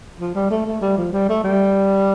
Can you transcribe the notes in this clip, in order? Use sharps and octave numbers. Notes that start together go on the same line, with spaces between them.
F3
G3
A3
A3
G3
F3
G3
A3
G3